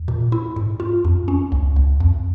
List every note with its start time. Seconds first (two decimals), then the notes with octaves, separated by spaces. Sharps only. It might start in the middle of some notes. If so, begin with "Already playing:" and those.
Already playing: E2
0.08 A#2
0.32 E4
0.56 G#2
0.80 F4
1.05 F2
1.28 C#4
1.52 C#2
1.76 C#2
2.00 F2